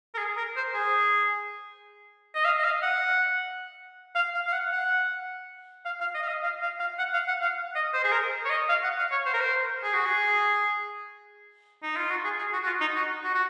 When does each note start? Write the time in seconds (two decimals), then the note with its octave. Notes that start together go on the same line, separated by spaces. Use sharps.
0.14 A#4
0.18 G#4
0.37 A#4
0.56 C5
0.74 G#4
2.35 D#5
2.45 F5
2.58 D#5
2.64 F5
2.83 F#5
4.15 F5
4.34 F5
4.47 F5
4.53 F#5
4.72 F#5
5.85 F5
6.00 F5
6.15 D#5
6.22 F5
6.28 D#5
6.43 F5
6.62 F5
6.80 F5
6.99 F#5
7.14 F5
7.28 F#5
7.42 F5
7.75 D#5
7.94 C5
8.04 G#4
8.12 A#4
8.45 C#5
8.50 D#5
8.69 F5
8.84 F#5
8.98 F5
9.12 C#5
9.26 C5
9.34 A#4
9.41 C5
9.84 G#4
9.94 F#4
10.05 G#4
11.83 D#4
11.97 F4
12.10 F#4
12.24 G#4
12.38 G#4
12.53 F#4
12.63 F#4
12.66 F4
12.81 D#4
12.96 F#4
13.24 F#4
13.34 F#4